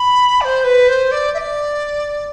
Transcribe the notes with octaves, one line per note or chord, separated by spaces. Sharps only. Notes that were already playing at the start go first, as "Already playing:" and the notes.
Already playing: B5
D5
C5
B4
C5
D5
E5
D5